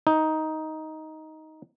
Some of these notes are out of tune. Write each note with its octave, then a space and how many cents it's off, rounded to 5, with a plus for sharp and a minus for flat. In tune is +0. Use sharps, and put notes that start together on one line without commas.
D#4 +10